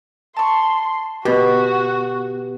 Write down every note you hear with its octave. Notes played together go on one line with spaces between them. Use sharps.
A5 C6 C#6
B2 B3 F#4 G4